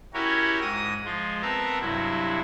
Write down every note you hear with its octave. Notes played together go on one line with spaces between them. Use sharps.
C#4 E4 F#4 G4 A#4 C#5
G#2 D#6 A#6
F3 G#3 F4
B3 C4 A#4 E5 A5 A#5
G2 C3 F#3 E4